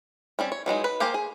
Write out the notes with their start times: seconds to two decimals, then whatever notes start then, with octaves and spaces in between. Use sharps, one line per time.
0.39 G3 C4 C#4
0.52 C#5
0.66 E3 F#3 G#3 D#4
0.84 B4
1.00 A#3 G4 G#4 A#4 C5
1.14 G#4